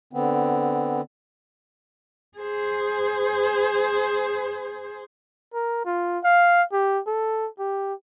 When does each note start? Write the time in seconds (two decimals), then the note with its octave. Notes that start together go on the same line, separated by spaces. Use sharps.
0.13 D3 B3 C4
2.38 G#4 C5
5.54 A#4
5.85 F4
6.24 F5
6.72 G4
7.07 A4
7.59 G4